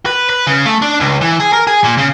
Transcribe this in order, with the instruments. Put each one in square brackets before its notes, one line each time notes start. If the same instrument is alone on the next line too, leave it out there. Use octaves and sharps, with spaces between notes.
[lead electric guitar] B4
B4
C#3
A3
D4
C#2
E3
G#4
A#4
G#4
A#2
C#3